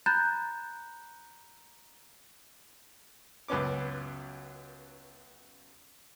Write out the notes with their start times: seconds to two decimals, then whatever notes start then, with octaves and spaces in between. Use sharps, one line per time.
0.06 A#5 B5 F#6 G6 A6
3.48 C#2 F#2 B3 C#4 D6